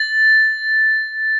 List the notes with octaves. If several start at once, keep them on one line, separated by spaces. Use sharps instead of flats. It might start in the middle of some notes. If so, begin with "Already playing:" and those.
Already playing: A6